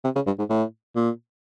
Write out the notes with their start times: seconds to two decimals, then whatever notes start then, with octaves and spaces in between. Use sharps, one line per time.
0.04 C3
0.15 C#3
0.26 G2
0.39 G#2
0.49 A2
0.96 A#2